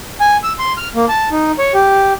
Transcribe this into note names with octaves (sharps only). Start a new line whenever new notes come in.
G#5
E6
C6
F6
A#3
A5
D#4
C#5
G4